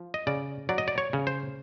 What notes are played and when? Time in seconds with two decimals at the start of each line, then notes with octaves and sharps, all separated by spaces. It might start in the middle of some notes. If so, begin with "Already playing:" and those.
Already playing: F3
0.14 D#5
0.27 C#3 D5
0.69 F#3 D5
0.78 D#5
0.88 D5
0.98 C#5
1.13 C#3
1.27 C5